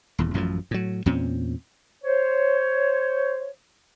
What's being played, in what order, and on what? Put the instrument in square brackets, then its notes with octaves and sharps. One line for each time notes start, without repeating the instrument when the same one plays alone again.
[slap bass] D#1 E2
A1 F#2 A2 F3
A2 F#3
E2 A#2 C4 C#4
[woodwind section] C5 C#5